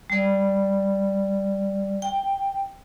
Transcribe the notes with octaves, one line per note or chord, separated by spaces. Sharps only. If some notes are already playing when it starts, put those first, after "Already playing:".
G3 D5
G5